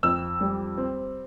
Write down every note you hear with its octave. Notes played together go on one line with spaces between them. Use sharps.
F2 E6
G3
C4